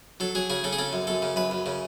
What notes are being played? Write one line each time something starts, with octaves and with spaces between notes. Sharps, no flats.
F#3 A4
F#3 G#4
C#3 G#4
C#3 A4
G#4
C#3 A4
F#2
F#2 A4
C#3
F#2 B4
F#2
C#3